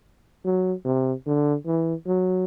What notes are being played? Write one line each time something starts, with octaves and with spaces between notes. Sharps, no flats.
F#3
C3
D3
E3
F#3